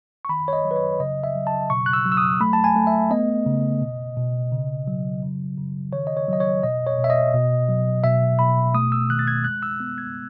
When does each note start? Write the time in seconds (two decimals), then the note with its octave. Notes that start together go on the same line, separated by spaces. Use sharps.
0.25 C#6
0.29 D#3 B5
0.48 C#5
0.53 D#5
0.65 F#3
0.71 B4
0.76 C#5
1.00 C#3 D#5
1.24 E5
1.35 F#3
1.47 A5
1.70 B2 C#6
1.86 F#6
1.93 E6
2.06 F#3
2.12 E6
2.17 D#6
2.40 A3 B5
2.53 A5
2.64 G#5
2.76 A3
2.87 E5
3.11 B3 D#5
3.46 C#3
3.81 B2
4.17 B2
4.52 C#3
4.87 F#3
5.22 C#3
5.58 C#3
5.93 D#3 C#5
6.07 D#5
6.17 C#5
6.28 F#3 D#5
6.40 C#5
6.63 B2 D#5
6.87 C#5
6.98 B2
7.04 E5
7.10 D#5
7.34 B2
7.69 F#3
8.04 B2 E5
8.39 B2 B5
8.74 A3 D#6
8.92 E6
9.10 D#3 F#6
9.19 A6
9.28 G#6
9.44 G#3 F#6
9.63 E6
9.80 B3
9.98 G#6